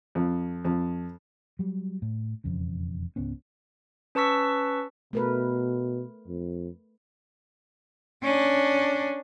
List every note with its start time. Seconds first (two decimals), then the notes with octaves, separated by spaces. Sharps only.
0.15 F2
0.65 F2
1.59 F#3 G3
2.02 A2
2.44 E1 F2 C#3
3.16 C#2 G#2 B3 C#4
4.15 C#4 B4 A5 C#6 E6 B6
5.13 B2 A3 A#4 B4
6.28 F2
8.23 C#4 D4